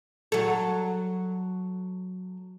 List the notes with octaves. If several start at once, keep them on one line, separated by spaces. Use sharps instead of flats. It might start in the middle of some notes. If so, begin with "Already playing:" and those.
F#3 A4